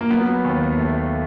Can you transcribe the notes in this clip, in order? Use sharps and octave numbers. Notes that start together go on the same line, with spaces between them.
A#3
F#3 B3
D#2
A3